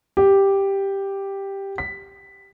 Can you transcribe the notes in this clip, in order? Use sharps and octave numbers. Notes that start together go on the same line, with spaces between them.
G4
B6